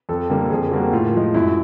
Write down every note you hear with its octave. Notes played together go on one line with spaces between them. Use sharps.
F2 A4
D3 G3 A#3
F2 G#4
D3 G3 A#3 F#4
A2 F4
F3 G#3
F#2 E4